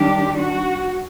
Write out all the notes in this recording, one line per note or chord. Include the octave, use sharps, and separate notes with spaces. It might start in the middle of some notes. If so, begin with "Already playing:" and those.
Already playing: D#3 G3 D4 G4
F#4